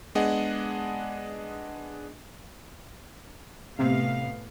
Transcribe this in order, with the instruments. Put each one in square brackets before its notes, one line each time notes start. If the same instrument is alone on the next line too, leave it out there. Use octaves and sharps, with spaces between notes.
[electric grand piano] G#3 B3 D4 G#4 D#5 F#5
[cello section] A2 B3 F5 [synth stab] C3